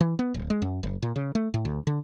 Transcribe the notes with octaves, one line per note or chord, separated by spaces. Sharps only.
E3
B3
D1
G#3
F#2
F#1
A#2
C#3
A3
A2
D2
D3